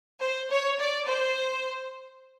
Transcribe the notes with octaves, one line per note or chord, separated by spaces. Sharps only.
C5
C#5
D5
C5